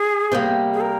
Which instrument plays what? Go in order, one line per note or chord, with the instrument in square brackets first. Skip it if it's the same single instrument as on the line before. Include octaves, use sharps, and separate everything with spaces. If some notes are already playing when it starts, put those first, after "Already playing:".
Already playing: [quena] G#4
[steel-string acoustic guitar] C3 G3 A#3
[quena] G#4
A#4